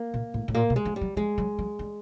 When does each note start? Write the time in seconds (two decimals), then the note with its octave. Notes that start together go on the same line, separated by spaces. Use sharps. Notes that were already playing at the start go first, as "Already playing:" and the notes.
Already playing: A#3
0.14 A#2
0.34 A2
0.48 A2
0.55 A#2 A#3
0.70 B2
0.76 G#3
0.85 F3
0.96 G3
1.01 F#3
1.17 F3 G#3
1.38 F#3
1.59 F#3
1.79 G3